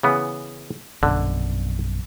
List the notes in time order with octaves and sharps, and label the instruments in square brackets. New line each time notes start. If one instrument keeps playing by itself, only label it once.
[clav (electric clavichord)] C#3 E3 B3
[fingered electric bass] A#1 F#2 B2 [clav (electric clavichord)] D3